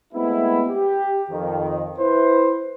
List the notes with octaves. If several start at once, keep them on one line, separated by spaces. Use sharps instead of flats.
G#3 A3 B3 C4 E4
G4
F2 D#3
E4 B4 C5